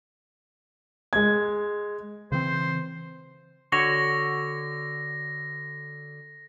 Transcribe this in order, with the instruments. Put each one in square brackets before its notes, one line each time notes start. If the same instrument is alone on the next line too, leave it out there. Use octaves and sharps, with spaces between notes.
[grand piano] G#3 G#6
[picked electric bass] C#3 E3 C4 [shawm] C5
[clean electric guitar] D3 F#4 C#5 [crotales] A#6